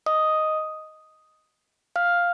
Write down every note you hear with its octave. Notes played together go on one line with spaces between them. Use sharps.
D#5 D#6
F5 F6